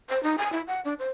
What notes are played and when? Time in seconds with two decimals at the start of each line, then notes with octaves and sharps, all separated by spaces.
0.09 C5
0.23 D#4
0.38 G#5
0.53 E4
0.67 F#5
0.85 D4
0.99 C5